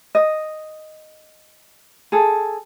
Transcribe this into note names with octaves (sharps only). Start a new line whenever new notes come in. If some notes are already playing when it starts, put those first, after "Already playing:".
D#5
G#4 A4